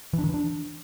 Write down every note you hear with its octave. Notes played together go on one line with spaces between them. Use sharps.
E3
D4
D#3
E3
D4